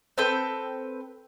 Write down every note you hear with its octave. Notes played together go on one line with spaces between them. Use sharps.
C4 A4 B4 G5